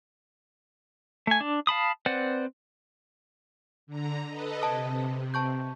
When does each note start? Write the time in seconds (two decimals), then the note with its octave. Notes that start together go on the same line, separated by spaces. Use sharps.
1.27 A3 G#5
1.41 D4
1.67 F5 A5 B5 D#6
2.06 C4 B4 C5 D5 F#5
3.87 D3 A#5
4.29 A4 B4 D#5
4.62 C3 D#5 A5 D#6
5.34 A5 C#6 G6